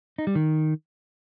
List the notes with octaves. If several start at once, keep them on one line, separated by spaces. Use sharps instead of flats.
D#4
G3
D#3